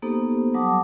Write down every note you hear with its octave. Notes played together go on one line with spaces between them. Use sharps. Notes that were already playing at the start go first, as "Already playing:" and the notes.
A#3 B3 D#4 G4 A4 C5
F#3 G3 F#5 A5 D6 D#6